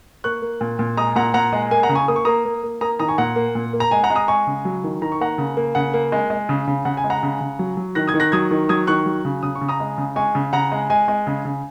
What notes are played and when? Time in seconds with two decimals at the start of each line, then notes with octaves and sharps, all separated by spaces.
0.24 A#3 C#6 F#6
0.42 A#3
0.61 A#2
0.79 A#2
0.97 G#3 A#5 D#6
1.16 A#2 F#5 A#5
1.34 A#2 F#5 A#5
1.53 G#3
1.71 A#3 G#5
1.83 F#5 A#5
1.89 C#3
1.95 G#5 C#6
2.08 A#3 D#6
2.16 C#6
2.25 A#3 A#5 D#6
2.45 A#3
2.63 A#3
2.81 A#3 A#5 D#6
3.00 D#3 A#5 D#6
3.08 G#5 C#6
3.18 A#2 F#5 A#5
3.36 A#3
3.55 A#2
3.73 A#3
3.80 A#5
3.91 G#3 G#5
4.03 F#5 A#5
4.10 G#3
4.16 A#5 D#6
4.28 G#3 G#5 C#6
4.47 C#3
4.65 F#3
4.84 D#3
5.02 D#3 A#5
5.12 C#6
5.20 A#3 F#5 A#5
5.38 C#3
5.57 A#3
5.75 C#3 F#5
5.93 A#3
6.12 G#3
6.30 G#3
6.49 C#3
6.68 C#3
6.85 C#3 F#5
6.97 G#5
7.04 G#3
7.10 F#5 A#5
7.23 C#3
7.41 C#3
7.59 F#3
7.77 F#3
7.95 D#3 F#6 A#6
8.08 D#6 G#6
8.14 D#3
8.20 F#6 A#6
8.32 F#3 D#6 G#6
8.51 D#3
8.69 F#3 D#6 G#6
8.87 D#3 C#6 F#6
9.06 F#3
9.25 C#3
9.43 C#3 D#6
9.55 C#6
9.61 C#3
9.69 A#5 D#6
9.80 G#3
9.98 C#3
10.16 G#3 G#5 C#6
10.35 C#3
10.53 C#3 F#5 A#5
10.72 G#3
10.90 G#3 G#5
11.08 G#3
11.27 C#3 G#5
11.45 C#3